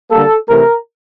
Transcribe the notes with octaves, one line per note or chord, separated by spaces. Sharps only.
D3 G3 A#3 A4
C3 E3 A3 A#4